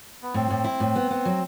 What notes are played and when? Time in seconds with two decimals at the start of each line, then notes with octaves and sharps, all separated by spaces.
0.22 B3
0.34 A2 C4
0.50 A2
0.64 E4
0.80 A2
0.95 B3
1.10 B3
1.25 F#3